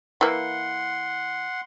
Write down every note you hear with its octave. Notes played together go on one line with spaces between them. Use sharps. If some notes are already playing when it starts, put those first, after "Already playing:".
E3 A#3 F#5 C6